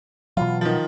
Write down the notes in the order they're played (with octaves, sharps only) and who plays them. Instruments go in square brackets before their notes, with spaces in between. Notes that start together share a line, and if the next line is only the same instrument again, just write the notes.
[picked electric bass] B2 E3 F#3 [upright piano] F4
[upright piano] D#3 F3